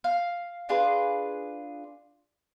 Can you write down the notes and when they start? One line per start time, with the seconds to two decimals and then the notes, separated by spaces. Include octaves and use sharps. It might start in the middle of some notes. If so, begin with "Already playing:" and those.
0.04 F5
0.69 D4 F4 G#4 B4